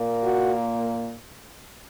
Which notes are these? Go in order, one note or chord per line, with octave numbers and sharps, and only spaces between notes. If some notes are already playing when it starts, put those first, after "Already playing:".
Already playing: A#2 A#3
F#4